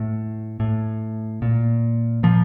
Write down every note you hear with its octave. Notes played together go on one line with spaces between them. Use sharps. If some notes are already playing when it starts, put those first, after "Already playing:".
Already playing: A2
A2
A#2
A#2 F3